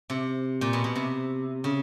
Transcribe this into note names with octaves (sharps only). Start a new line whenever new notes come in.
C3
A#2
B2
B2
C3
C#3